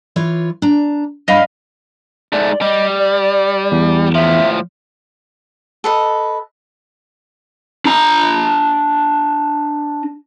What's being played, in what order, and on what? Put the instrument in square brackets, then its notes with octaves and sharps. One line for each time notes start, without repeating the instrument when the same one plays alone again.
[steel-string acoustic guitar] E3 F4 C#5
D4 A#5
[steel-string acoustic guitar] G2 [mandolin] D#5 F5 B5
[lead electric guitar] G#2 A3 [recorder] D5
[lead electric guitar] G3 [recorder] D#5
[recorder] D5
[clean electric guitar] E2
[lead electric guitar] A2 F3 [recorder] E5
[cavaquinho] A4 B4 D#5
[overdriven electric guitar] D4 A#5